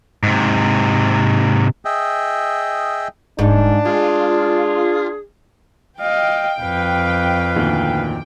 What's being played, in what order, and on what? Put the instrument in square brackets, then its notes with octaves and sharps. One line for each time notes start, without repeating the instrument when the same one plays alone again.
[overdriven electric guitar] G#2 C3
[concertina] G#4 D#5 E5 G5
[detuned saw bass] D#1 [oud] G#2 [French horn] D4
[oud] G#3 [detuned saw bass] F4 [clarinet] G#4
[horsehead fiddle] D#5 F5 [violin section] G5
[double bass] F2 [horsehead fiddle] B4 F5
[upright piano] D2 A#2 D#3